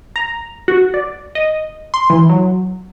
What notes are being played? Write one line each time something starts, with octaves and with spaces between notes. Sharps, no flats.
A#5
F#4
D5
D#5
C6
E3
F#3